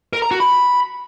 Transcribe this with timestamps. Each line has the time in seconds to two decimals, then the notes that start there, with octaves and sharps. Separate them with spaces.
0.13 A#4
0.22 A#5
0.31 F#4
0.40 B5